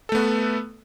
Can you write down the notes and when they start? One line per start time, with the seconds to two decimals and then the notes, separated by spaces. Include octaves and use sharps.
0.09 A4
0.12 A3
0.15 B3
0.18 B4